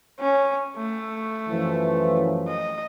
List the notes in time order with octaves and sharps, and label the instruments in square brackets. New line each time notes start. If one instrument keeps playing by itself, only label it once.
[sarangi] C#4
A3
[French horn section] F#2 E3 F3
[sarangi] D#5